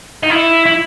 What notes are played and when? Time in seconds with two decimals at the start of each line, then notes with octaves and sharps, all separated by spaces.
0.23 D#4
0.30 E4
0.66 E4